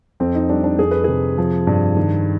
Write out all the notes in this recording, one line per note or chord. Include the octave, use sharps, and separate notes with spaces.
F2 C4
D#4
G3 D4
D4
F2 G#4
B4
C3 G#4
F3
G2
D#3